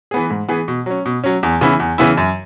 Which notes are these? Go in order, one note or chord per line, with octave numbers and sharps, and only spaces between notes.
E3 B3 G#4
G#2
E3 B3 G#4
B2
F#3 C#4
B2
F#3 C#4
E2
C#3 E3 B3 E4
E2
C#3 E3 B3 E4
F#2